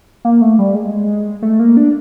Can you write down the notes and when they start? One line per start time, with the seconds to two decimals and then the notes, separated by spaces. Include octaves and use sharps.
0.25 A#3
0.41 A3
0.59 G3
0.75 G#3
1.42 A3
1.59 A#3
1.77 D4